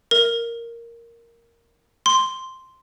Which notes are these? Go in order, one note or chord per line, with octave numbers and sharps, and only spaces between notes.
A#4
C6